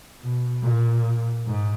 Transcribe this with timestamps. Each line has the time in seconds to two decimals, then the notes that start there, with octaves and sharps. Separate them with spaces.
0.21 B2
0.62 A#2
1.46 G#2